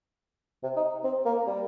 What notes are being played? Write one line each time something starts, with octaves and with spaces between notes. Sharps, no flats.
C3
D#4
C4
A#3
G3